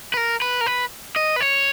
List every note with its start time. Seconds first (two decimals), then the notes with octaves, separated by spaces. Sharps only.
0.14 B4
0.17 A#4
0.42 B4
0.61 A#4
0.66 B4
1.16 D#5
1.36 B4
1.41 C#5